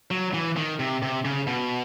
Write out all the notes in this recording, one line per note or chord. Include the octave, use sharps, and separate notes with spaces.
F#3
E3
D#3
C3
C3
C#3
B2